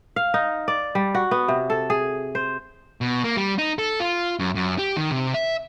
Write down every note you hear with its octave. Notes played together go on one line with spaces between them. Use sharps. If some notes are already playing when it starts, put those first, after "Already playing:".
F5
D#4
D5
G3
F#4
B3
C3
A4
G#4
C5
B2
A#3
G3
D#4
A4
F4
F#2
F#2
G4
D#3
C3
E5